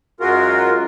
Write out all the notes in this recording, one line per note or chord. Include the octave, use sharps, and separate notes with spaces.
F#2 G#3 F4 F#4 A#4